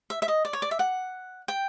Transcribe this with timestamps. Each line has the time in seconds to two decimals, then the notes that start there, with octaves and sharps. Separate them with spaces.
0.10 E5
0.22 E5
0.28 D#5
0.45 D5
0.53 C#5
0.62 D5
0.71 E5
0.79 F#5
1.48 G5